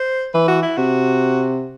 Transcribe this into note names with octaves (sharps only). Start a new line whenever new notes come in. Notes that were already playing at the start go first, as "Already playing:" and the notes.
Already playing: C5
E3 B4
F#4
E4
C3 F#4